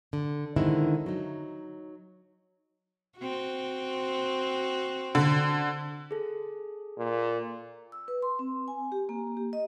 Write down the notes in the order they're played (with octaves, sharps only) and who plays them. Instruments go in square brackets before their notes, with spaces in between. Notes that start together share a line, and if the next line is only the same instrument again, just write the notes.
[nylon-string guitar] D3
D3 D#3 G#3 C4 D#4 E4
F#3 D#4
[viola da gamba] C4 F#4
[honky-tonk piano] D3
[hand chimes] G#4 A4
[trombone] A#2
[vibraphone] E6
B4
C6
C4
G#5
G4
A#3
G4
D#5